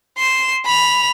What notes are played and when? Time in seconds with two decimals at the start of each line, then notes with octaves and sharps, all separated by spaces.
0.18 C6 E7
0.65 B5 F7